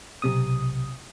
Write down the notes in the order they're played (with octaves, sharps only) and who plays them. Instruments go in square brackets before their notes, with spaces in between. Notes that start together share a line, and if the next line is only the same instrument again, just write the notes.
[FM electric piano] B1 C3 D#6